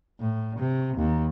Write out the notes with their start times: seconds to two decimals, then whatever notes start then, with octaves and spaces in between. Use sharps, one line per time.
0.20 A2
0.59 C3
0.97 D#2